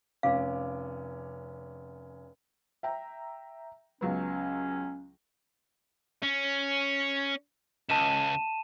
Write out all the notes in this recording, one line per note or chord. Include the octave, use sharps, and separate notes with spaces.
F1 C#4 F5 D6
E5 G5 A#5
C#2 F#3 B3 C#4
C#4
C#2 A5 D#7 E7